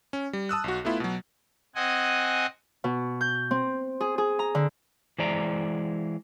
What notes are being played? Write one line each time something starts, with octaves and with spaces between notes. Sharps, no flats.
C#4
G3
A5 D#6 E6 F#6
B1 F#4
A3 B3 E4 F4
B2 F#3
C4 D#5 F#5 G#5
B2
G6
C4
G#4
G#4
A#5
D3
E3 G#3 C5 D5 A#5